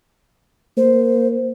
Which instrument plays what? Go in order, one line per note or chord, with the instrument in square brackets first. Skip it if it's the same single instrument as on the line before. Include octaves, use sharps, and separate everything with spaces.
[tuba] A#3 [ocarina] C5